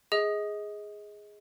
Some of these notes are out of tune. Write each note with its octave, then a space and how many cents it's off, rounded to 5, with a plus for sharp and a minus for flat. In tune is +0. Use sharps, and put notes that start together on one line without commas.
G#4 +0 D#5 +25